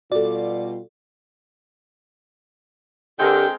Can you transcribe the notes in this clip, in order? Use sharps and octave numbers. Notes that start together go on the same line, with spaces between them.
B2 G3 F4 F#4 A4 D5
D3 G#3 C4 G4 A#4 G5